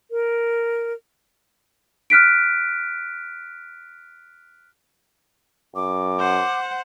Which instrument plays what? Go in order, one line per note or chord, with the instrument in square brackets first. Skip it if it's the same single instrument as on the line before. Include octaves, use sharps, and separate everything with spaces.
[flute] A#4
[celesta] F6 F#6 B6 D7
[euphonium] F#2 [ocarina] D6
[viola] C5 F#5